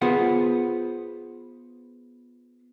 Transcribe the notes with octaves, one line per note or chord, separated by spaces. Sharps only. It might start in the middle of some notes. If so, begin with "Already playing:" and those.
B3 F4 G#4 B4 C5 F#5